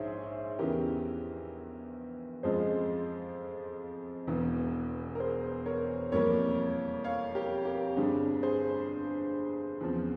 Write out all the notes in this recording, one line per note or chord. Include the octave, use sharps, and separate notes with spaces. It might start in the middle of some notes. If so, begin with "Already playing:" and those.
Already playing: A#1 G#2 G#4 C5 C#5 E5
E2 C#3 E3 G4 A#4
F2 C#3 F3 G#3 G#4 C5
E1 E2 E3
A#4
G#4 C5
A#4 C#5
F2 E3 G3 A#3 A#4 C#5
C#5 F5
G4 A#4
G4 A#4
G1 G2 G3 C4 G#4
G#4 C5
E2 C#3 F3 C4